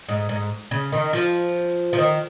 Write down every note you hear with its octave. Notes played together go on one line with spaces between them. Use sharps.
G#2
G#2
C#3
D#3
F3
F3
D#3